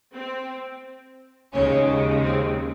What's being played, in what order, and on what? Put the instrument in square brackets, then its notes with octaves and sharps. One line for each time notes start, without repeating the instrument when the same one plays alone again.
[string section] C4
D#2 C#3 G#3 C#4
C4